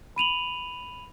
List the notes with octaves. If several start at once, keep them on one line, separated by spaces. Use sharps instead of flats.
B5 D#7 F7 F#7